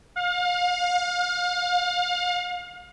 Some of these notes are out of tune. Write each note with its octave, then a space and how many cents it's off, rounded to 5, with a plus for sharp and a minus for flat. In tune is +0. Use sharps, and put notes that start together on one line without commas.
F5 +35